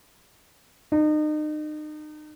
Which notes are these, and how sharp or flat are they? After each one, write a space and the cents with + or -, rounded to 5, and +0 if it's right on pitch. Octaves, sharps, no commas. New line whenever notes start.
D#4 -35